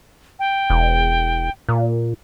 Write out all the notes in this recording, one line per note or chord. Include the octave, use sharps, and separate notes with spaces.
G5
E1
A#2